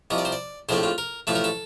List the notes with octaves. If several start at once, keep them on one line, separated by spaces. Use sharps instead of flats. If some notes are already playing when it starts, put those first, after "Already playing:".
C2 C3 F3 D#5
D5
C5
D5
A#1 A2 F3 A3 C4 C5
F4
A#4
A1 A2 F3 A3 A4
A#4
A4